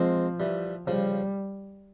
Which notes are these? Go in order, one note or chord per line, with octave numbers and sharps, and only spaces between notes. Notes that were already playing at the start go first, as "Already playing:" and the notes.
Already playing: F3 G#3 C4
E3 G3
C#3 F3 G3